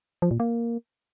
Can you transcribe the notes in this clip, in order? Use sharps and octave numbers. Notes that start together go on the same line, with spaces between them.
F3
A#2
A#3